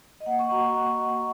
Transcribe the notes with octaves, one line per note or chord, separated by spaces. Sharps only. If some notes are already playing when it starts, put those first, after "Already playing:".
D#5
A#3 F#5
C#6
F#4 A#5